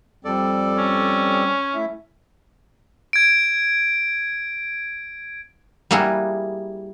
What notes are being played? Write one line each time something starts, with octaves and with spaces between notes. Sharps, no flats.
F2 G3 C4 A4 D5
C#4
A3 E4 E5
G#6 D7
G3 A#3 E4 F#4 G#4